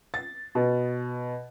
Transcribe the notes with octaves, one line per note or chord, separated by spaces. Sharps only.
A6
B2